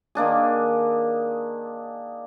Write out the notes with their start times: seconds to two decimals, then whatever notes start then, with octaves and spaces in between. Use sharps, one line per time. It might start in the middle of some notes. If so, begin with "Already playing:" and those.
0.15 D#3 A#3 D4 G#4